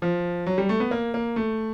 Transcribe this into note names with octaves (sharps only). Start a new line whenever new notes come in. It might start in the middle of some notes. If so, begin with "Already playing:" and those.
F3
F#3
G3
A3
B3
A#3
A#3
A3